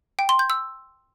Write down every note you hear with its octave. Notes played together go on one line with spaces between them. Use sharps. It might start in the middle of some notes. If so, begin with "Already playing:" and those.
G5
C6
G6
E6